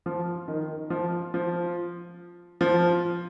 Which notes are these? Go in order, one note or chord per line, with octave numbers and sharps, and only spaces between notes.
F3
D#3
F3
F3
F3